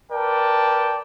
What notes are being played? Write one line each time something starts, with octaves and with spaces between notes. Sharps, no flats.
A#4 B4 D5 G5 A5